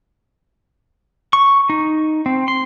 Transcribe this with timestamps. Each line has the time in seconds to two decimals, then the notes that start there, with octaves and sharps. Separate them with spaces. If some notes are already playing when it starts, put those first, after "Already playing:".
1.33 C#6
1.70 D#4
2.26 C4
2.48 C6